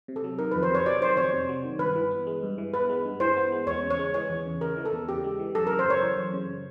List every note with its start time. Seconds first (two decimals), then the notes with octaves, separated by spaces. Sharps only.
0.08 C3
0.16 A4
0.24 F#3
0.39 D#3 A#4
0.51 F2 B4
0.63 C5
0.71 C3 C#5
0.86 F#3 D5
1.01 D#3 C5
1.17 F2 C#5
1.33 C3
1.49 F#3
1.64 D#3
1.79 G2 B4
1.96 E3
2.11 B3
2.27 G#3
2.43 G2
2.58 E3
2.74 B3 B4
2.89 G#3
3.05 G2
3.20 E3 C5
3.37 B3
3.52 G#3
3.67 E2 C#5
3.83 C#3
3.90 C#5
3.99 G#3
4.14 E3 C#5
4.30 E2
4.46 C#3
4.61 G#3 A#4
4.77 E3
4.85 A4
4.93 E2
5.09 C#3 G4
5.24 G#3
5.39 E3
5.55 F#2 A4
5.67 C#3 A#4
5.79 C5
5.86 F#2 C#5
6.02 E3
6.17 F#2
6.34 C#3